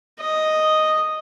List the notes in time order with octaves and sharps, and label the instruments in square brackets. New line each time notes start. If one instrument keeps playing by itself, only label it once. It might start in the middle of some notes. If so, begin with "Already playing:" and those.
[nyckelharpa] D#5